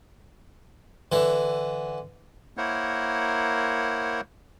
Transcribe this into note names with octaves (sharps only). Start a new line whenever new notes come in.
D3 E3
A#3 E4 A#4 C5 C#5 F#5